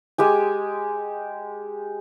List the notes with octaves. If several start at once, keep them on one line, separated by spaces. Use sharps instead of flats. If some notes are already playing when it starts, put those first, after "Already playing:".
G#3 G4 G#5